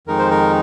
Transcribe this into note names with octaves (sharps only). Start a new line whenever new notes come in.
F2 D#3 G#3 D#4 A#4
C5
A#4